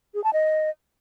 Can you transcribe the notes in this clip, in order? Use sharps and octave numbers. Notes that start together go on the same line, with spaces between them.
G#4
A5
D#5